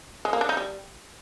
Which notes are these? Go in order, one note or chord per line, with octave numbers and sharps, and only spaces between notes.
G#3
A#3
D4
D#4
G3